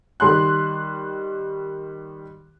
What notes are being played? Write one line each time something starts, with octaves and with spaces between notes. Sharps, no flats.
D#3 G3 C6 F#6